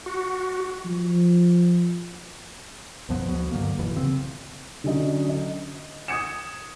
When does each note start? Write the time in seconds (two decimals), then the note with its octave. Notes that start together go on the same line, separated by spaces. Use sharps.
0.06 F#4
0.85 F3
3.09 B1 F#2 F3 B3
3.29 D2 F#3 B3
3.52 G2 D3 A#3
3.78 D#1 B1 F#2 E3
3.96 C#3 C4
4.84 D3 F#3 C#4 D#5
5.29 D#5
6.08 D#6 G#6 C#7 E7